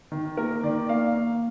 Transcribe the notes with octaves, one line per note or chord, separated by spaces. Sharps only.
D#3
A#3 A#4
D#3 D5
A#3 F5
A#3